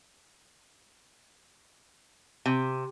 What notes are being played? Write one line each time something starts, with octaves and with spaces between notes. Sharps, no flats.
C3